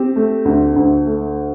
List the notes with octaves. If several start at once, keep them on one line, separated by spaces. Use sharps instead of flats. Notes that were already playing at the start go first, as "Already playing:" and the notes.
Already playing: C4 G4
A3
D2
D2
A3